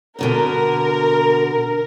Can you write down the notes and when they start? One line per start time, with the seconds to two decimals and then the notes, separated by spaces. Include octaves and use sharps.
0.19 B2 D3 B3 A#4